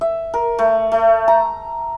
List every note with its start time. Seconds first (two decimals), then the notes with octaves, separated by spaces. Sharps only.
0.01 E5
0.34 A#4
0.59 A3
0.92 A3
1.28 A#5